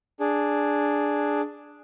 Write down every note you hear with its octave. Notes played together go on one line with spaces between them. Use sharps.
D4 G#4